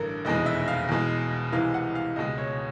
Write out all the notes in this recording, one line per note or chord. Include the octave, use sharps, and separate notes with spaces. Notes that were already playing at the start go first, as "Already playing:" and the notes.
Already playing: A1 G2 D3 A4 A#4
F1 E2 B2 G#3 D#5
E5
F5
E2 B2 G#3
C2 C3 E3 G#3 F5
F#5
F5
C#2 B2 G#3 D#5
C#5